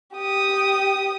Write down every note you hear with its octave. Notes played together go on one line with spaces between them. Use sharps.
G4 D#6